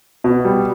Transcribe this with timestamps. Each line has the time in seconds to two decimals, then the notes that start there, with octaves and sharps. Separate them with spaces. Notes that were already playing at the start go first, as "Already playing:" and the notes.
0.24 B2
0.45 G3